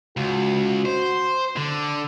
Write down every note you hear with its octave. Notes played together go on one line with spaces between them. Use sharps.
C#2 F#4
C5
D3